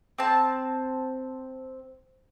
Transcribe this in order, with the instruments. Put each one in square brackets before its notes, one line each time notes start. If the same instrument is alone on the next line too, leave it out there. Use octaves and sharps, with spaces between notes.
[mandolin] C4 A5